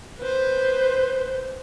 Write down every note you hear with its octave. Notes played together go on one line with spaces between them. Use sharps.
B4 C5